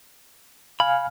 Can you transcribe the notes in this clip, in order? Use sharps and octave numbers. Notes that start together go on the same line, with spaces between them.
F5 G#5 B5 F6